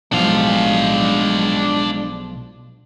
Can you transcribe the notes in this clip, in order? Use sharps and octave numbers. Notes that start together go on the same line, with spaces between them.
B1 F3 G#3 D4 F5